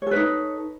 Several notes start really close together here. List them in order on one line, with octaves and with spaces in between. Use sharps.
C#5 A4 B4 D#4